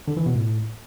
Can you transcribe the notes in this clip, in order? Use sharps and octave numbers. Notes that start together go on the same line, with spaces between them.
D3
E3
B2
A2